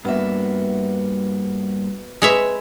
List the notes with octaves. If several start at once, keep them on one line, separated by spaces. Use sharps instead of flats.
G2 A#3 B3 F#4 E5
G#3 C4 B4 C#5 E5